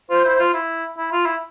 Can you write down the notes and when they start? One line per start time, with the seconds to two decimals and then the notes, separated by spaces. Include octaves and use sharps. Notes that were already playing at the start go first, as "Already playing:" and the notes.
0.10 F4 C5
0.25 E4
0.39 F4
0.54 E4
0.98 E4
1.13 F4
1.26 E4